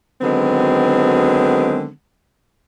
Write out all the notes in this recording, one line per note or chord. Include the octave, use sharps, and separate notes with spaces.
D3 D#3 F#3 G#3 B3 C4